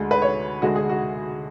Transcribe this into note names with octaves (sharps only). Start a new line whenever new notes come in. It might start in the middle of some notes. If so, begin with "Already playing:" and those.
Already playing: D2 D3 G#3
B4
C#5
D2 D3 G#3 F#4
G#4
F#4